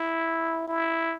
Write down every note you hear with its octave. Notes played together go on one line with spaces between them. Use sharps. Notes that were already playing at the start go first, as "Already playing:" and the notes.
Already playing: E4
E4